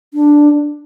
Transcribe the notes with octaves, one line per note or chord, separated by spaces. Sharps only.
D4